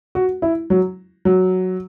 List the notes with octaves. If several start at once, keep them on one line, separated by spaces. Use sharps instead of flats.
F#4
E4
F#3
F#3